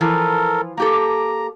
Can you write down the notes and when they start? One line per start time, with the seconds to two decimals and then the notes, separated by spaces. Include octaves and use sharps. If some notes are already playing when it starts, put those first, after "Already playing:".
0.01 E3 F3 F4 A4 A#4
0.77 A#3 G4 A4 A#5